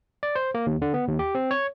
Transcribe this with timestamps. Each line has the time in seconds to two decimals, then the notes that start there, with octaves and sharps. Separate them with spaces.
0.23 D5
0.36 C5
0.55 A#3
0.67 D#2
0.82 D3
0.94 B3
1.07 D#2
1.19 G4
1.35 C4
1.51 C#5